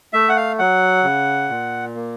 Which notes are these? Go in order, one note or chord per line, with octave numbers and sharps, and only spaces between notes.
A3 E5
F#5
F5
F#3 F#5
C#3
A#2
A#3